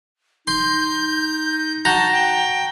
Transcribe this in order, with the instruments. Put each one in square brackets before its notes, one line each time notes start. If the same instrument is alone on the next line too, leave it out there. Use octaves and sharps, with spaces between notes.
[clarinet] D#4 [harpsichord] C6 [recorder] G6
[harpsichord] F#4 [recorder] A5 [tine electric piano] A#5 G6
[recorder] G5